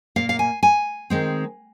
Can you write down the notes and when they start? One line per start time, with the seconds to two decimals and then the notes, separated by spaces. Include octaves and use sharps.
0.16 A#2 A#3 F5
0.29 F5
0.39 G#5
0.63 G#5
1.10 D#3 G#3 C4